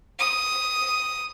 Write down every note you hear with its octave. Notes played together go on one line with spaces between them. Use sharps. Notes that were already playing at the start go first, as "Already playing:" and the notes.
D#6